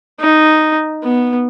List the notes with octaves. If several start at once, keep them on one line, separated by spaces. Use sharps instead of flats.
D#4
B3